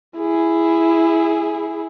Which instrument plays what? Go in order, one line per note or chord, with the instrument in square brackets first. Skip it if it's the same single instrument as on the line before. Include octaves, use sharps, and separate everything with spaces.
[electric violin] E4 G#4